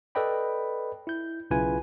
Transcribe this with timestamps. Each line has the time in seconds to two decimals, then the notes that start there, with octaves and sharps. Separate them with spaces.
0.15 A4 B4 D5 D#5 G5 B5
1.07 E4 G6
1.51 B1 C#3 E4 F4 B4 G#5